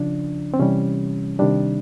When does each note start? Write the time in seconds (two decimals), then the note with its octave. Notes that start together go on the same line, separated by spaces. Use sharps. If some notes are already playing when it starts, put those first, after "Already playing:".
Already playing: C#3 F3 D4
0.54 C4
0.60 C3 E3 G3 C#4
1.39 C3 D#3 G3 D4